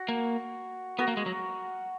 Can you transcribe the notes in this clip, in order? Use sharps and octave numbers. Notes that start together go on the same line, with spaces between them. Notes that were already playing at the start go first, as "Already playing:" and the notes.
Already playing: F#4
A#3
B3 F#4 A#4
A#3
G#3
F#3